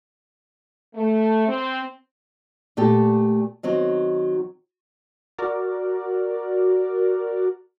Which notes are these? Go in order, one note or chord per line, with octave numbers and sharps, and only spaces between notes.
A3
C4
A#2 A3 G4 A4
D#3 F#3 C4
F#4 A#4 D5